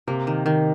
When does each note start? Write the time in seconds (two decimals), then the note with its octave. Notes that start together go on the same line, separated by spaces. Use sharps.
0.08 C3 A#3
0.27 D#3
0.46 D#3